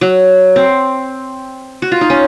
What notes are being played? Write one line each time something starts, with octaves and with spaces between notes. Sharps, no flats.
F#3
C4
F#4
F4
D#4
C#4